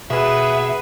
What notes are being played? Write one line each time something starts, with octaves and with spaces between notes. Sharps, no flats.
B2 G#4 B4 E5 F#5